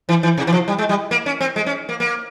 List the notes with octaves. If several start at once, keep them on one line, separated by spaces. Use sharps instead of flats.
E3
E3
C3
E3
F3
G3
G#3
G3
A#3
C#4
C4
G#3
C#4
A#3
A#3